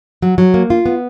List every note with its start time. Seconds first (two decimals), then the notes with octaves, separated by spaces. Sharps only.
0.22 F#3
0.38 F#3
0.54 A#3
0.70 F4
0.86 B3